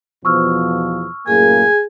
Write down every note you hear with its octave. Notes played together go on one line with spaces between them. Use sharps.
E2 B2 F3 C#6 E6 F6
F#2 A2 A#3 G#4 G#5